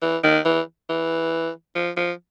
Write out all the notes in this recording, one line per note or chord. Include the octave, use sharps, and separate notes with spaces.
E3
D#3
E3
E3
F3
F3